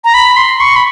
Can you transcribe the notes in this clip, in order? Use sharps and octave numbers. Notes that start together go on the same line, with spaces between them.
A#5
B5
C6
C#6
B5